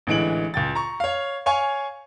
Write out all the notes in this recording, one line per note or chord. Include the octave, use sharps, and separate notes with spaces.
A1 D3 E3 G#3 D7 F#7
C#2 G5 A6
A#5 C#6
C#5 F5
C#5 F5 G#5 C#6